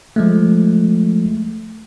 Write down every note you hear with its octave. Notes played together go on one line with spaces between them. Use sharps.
F3 G#3 A3